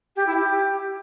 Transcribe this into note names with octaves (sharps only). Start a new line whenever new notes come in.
G4
E4
G4